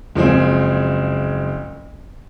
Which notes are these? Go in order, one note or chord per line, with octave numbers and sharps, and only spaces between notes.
F#1 F3 G#3 C4 G#4